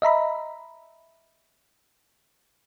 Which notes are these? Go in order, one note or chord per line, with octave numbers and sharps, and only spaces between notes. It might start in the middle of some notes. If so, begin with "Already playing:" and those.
D#5 E5 A#5 B5